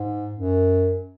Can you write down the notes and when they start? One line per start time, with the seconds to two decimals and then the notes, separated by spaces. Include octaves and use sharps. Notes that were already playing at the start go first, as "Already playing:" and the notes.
Already playing: G#2
0.35 F#2